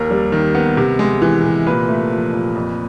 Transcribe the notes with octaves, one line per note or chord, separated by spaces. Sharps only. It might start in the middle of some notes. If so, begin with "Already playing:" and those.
Already playing: D#2 A#4
G3
D#3
B3
C3
G#3
E3
C3
A#2 B4
A3
F3
A#2
F2